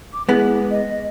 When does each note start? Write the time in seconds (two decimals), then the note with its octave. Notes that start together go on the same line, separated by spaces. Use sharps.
0.13 D6
0.29 G#3 B3 E4
0.71 D#5